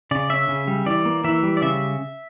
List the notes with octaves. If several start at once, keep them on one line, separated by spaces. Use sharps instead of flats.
C#3 D5
C#4 E5
C#3
G3
E3 D5
A#3
E3 E5
G3
D5
C#3 E5